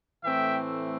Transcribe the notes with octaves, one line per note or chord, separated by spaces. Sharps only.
A2 E3 A3 C4 E5 G5